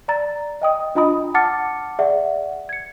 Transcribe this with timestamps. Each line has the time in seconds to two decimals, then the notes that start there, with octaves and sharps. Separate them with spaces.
0.08 D5 A#5 A6
0.62 D#5 G5 D#6
0.95 D4 F4 D#5 A#5 B5 D#6
1.34 F#5 A5 D6 F6 A6 C#7
1.99 G#4 D5 E5 F#5
2.69 G#6 C#7